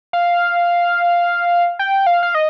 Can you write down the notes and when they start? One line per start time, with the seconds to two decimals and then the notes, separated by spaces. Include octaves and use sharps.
0.13 F5
1.79 G5
2.06 F5
2.23 F5
2.35 D#5